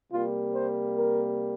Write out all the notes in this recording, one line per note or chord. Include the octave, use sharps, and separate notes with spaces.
C3 G3 A#3 F4
C5
A#4